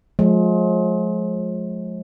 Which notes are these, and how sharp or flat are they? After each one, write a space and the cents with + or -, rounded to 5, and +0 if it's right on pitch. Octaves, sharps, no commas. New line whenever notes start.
F3 +40 G#3 +35